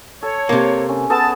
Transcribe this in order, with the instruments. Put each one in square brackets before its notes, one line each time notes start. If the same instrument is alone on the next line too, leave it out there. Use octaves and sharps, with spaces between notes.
[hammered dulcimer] A4 [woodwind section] C#5
[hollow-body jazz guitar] C3 A#3
[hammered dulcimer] C#4
[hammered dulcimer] B3 G#4 A4 [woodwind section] A5